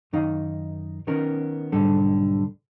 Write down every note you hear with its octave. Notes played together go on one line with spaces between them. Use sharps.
F#2 D#3 D#4 D#5 F5
D#3 B3 C#4 A#4
B1 G#2 D3 G3 A4